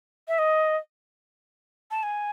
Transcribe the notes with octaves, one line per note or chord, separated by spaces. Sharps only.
E5
D#5
A5
G#5